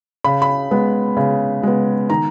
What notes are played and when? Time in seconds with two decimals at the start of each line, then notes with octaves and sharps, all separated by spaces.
0.24 C#3 B5
0.42 B5
0.71 G#3 B3
1.17 C#3
1.63 G#3 B3
2.10 D#3 A#5